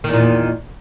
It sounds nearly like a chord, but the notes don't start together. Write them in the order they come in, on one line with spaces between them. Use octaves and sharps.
D#3 E2 A#2